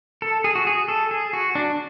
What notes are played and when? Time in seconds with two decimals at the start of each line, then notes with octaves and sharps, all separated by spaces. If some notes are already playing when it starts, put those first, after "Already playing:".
0.22 A4
0.44 G#4
0.55 F#4
0.67 G#4
0.88 A4
1.11 G#4
1.33 F#4
1.55 D4